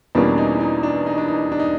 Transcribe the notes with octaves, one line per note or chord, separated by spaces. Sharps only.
E2 B2 G3 A#3 C#4 D4
D#4
D#4
D4
D#4
D4
D#4
D4
D#4